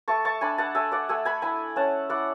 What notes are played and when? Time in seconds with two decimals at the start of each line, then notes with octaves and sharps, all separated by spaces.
0.08 A3 A5 C#6
0.25 A5 C#6
0.41 D4 G#5 B5
0.58 F#5 A5
0.75 A3 E5 G#5
0.92 D5 F#5
1.09 A3 E5 G#5
1.25 G#5 B5
1.42 E4 G#5 B5
1.76 C#4 F#5 A5
2.09 E4 D5 F#5